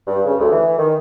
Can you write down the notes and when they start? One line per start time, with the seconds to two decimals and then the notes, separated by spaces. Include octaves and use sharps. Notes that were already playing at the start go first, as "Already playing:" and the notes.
0.07 G2
0.26 C#3
0.39 D2
0.51 E3
0.77 D#3